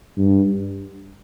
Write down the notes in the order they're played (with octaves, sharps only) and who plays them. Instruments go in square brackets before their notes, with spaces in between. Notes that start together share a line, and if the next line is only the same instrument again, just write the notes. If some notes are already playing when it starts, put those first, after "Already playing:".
[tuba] G2